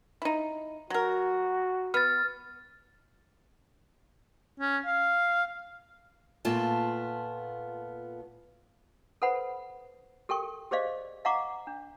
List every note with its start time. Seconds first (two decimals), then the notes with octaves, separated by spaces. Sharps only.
0.22 D#4 E4
0.90 F#3 F#4 A#4
1.94 B3 F6 A6
4.60 C#4
4.86 F5
6.45 A#2 A3 B3 F4 E5 A5
9.22 A4 B4 C5 F#5 B5
10.29 G4 A4 A#4 G5 C#6
10.71 G4 G#4 C5 D5 D#5 F5
11.25 D#5 F5 F#5 A#5 C#6 D6
11.67 D4